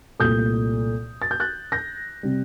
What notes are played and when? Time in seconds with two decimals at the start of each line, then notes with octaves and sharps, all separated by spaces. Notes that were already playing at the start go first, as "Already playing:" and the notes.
0.19 C2 A#2 A3 D#6 G6
1.22 A6
1.31 G6
1.40 F#6 A6
1.72 G6 A#6
2.23 C3 G3